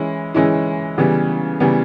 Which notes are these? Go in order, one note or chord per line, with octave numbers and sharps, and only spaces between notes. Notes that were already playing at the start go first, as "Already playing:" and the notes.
Already playing: E3 G#3 C#4 E4
E3 G#3 C#4 E4
C#3 E3 G3 B3
C#3 E3 G3 B3